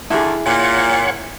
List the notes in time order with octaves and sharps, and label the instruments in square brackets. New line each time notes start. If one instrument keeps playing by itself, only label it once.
[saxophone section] D#2 D3 [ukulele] E4 G#4
[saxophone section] A#2 [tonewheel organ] C#5 F#5